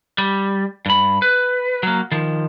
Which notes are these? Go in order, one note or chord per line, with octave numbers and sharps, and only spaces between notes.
G3
G2 B5
B4
F#3 A#3
D#3 F3